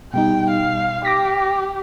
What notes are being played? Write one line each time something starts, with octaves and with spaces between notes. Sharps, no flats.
B2 G3 D#4 G5
F5
G4 D6 A#6 B6